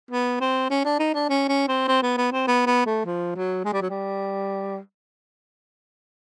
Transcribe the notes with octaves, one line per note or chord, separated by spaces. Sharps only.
B3
C4
C#4
D4
D#4
D4
C#4
C#4
C4
C4
B3
B3
C4
B3
B3
A3
F3
F#3
G#3
G3
F#3
G3